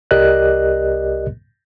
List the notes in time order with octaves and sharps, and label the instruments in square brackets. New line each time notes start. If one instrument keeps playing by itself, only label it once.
[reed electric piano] C2 G4 A#4 D5 D#5 F#6